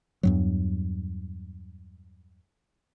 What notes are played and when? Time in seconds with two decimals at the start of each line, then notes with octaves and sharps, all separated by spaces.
0.23 E2 G2 F#3